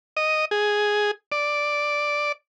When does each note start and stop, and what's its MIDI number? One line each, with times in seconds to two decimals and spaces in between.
0.17 0.45 75
0.51 1.11 68
1.32 2.32 74